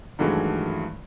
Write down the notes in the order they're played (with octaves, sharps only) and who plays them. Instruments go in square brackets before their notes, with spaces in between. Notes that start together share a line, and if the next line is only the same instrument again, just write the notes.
[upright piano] G2 D#3 E3 F#3 G#3 A3